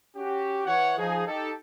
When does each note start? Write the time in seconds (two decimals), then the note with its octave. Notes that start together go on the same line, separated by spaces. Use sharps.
0.16 C#4 F#4 G4
0.67 E3 C#5 F#5
0.98 F3 D#4 G#4
1.27 D#4 G4 A4